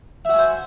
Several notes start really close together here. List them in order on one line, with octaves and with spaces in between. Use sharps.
E5 F#4 G#5 C5